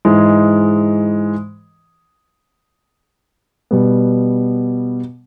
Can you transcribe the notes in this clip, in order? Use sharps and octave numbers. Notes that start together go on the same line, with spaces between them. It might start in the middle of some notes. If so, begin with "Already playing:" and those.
G#2 E3 G#3
B2 G3 B3